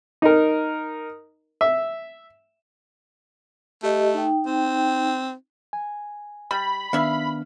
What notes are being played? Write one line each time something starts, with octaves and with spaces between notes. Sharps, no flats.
D#4 A#4
E5
A3 G4 D#5
D#4 G5
C4
G#5
G3 B5
D#3 B3 D4 E5 F5